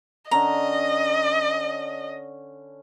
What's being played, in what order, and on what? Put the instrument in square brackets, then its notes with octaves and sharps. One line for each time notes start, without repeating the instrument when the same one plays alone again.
[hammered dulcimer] D3 C#4 [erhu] D#5 [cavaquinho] A#5